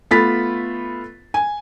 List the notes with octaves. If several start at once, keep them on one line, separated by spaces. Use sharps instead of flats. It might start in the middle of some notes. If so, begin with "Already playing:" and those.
A3 B3 F4 B5 A6 B6
G#5